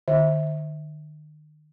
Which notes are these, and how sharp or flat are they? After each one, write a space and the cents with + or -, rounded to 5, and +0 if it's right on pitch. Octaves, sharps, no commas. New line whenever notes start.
D#3 -40 E5 -20